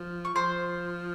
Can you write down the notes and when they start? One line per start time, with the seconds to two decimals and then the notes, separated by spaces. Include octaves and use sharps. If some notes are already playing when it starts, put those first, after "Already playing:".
Already playing: F3
0.25 C#6
0.35 F3 C5 C6